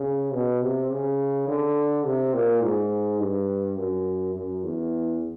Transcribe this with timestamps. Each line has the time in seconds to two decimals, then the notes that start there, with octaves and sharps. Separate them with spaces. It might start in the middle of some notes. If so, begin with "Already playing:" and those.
Already playing: C#3
0.34 B2
0.62 C3
0.91 C#3
1.47 D3
2.05 C3
2.34 A#2
2.62 G#2
3.20 G2
3.77 F#2
4.35 F#2
4.64 E2